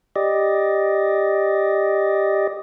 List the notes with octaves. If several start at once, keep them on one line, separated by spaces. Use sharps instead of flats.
G4 D5 D#5